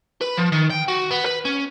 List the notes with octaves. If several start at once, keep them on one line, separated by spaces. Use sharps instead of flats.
B4
F3
D#3
G5
F#4
B3
B4
C#4